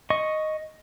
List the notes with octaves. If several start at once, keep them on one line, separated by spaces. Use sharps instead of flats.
D#5 C#6